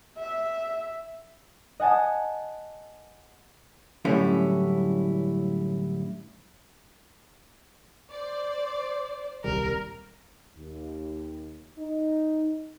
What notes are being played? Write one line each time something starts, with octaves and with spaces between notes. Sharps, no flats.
E5
D#5 F#5 G#5 A5 D#6
F#2 A2 D3 G3 C#4 E4
C5 D5
D#1 C2 G3 A#4
D#2
D#4